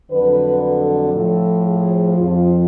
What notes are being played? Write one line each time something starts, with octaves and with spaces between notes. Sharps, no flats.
F2 D3 F#3 B4
A4
A2 F3 A4
G#4
F2 F3 F4